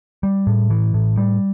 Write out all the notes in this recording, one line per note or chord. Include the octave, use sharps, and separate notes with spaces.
G3
A2
E3
A2
G3